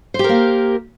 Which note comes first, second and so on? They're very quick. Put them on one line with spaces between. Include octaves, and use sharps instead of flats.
C5 G4 A#4 A#3